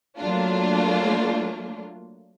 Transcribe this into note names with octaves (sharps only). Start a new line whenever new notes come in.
F#3 A3 A#3 D4 F4